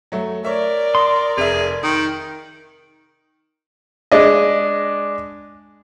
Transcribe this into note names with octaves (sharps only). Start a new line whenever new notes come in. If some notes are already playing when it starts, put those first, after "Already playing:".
F#3 A3
A#4 C#5 D5 E5
C6 D#6
F1 G#4 E5
D#3 D#6
G#3 D4 D#5